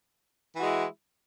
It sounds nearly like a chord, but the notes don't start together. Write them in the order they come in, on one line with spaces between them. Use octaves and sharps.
E3 F#4 G#3 E4